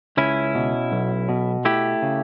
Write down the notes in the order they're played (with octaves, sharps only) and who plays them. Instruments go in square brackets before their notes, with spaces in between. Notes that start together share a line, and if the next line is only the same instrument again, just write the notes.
[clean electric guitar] C#2 C#4 E4
B2
B1
B2
A3 E4 G4
C#3